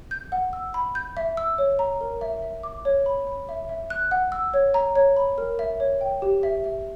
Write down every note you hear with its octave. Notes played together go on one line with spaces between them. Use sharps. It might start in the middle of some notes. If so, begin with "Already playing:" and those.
G6
F#5
E6
B5
G6
E5
E6
C#5
A#5
A#4
E5
E5
D6
C#5
B5
B5
E5
E5
F#6
F#5
E6
C#5
A#5
C#5
B5
A#4
E5
C#5
G5
G4
E5
E5